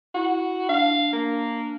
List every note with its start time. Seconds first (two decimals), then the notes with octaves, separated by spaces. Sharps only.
0.15 E4 F#4
0.69 D4 F5
1.13 A#3